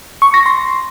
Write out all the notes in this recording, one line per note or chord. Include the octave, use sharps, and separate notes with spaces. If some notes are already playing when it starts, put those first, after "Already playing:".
C#6
A#6
C6